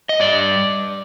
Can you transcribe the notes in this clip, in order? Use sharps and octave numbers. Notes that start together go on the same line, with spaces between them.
D#5
G2 D5